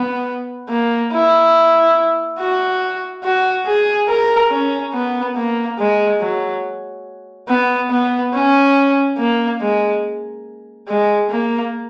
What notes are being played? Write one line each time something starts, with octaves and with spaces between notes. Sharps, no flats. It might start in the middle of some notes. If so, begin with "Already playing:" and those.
Already playing: B3
A#3
E4
F#4
F#4
G#4
A#4
C#4
B3
A#3
G#3
F#3
B3
B3
C#4
A#3
G#3
G#3
A#3